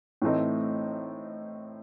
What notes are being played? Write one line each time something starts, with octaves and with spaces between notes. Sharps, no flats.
A2 E3 A3 C4 D#4